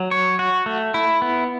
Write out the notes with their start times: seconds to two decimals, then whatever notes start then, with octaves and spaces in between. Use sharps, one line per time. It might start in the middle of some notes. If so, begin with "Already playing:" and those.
Already playing: F#3
0.11 C#5
0.39 F#4
0.66 A3
0.94 E4
1.22 B3